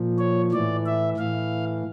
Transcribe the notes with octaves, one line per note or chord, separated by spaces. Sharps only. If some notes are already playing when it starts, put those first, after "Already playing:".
Already playing: A#2 F3
C#5
A2 E3 D5
E5
A2 E3 F5